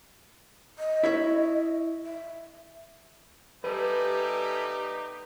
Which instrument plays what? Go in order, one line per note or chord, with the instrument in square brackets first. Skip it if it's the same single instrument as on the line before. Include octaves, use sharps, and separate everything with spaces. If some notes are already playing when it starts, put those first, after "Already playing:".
[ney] D#5
[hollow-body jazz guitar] E4 C#5 E5
[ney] E5
[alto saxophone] G3 [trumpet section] B3 D#4 G4 [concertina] A4 E5 G#5 [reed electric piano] B4